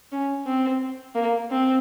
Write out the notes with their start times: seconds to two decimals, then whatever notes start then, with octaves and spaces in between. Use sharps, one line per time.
0.12 C#4
0.47 C4
1.15 A#3
1.50 C4